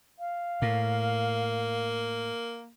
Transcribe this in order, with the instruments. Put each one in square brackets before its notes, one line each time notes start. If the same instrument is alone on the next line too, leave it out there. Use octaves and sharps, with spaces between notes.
[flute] F5
[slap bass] A2 [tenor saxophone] A#3